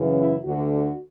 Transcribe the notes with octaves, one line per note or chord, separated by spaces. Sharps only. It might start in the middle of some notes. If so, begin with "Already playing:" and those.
Already playing: F#2 C#3 E3
E4
D2 D3 F#4
F#4